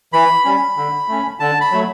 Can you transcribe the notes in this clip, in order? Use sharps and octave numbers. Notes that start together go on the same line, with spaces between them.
E3 B5
G3 C#4
D3
A3 C#4
D3 A5
B5
F#3 A3